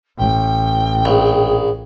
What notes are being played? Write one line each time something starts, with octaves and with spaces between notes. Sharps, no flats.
A1 G5
A#1 G#4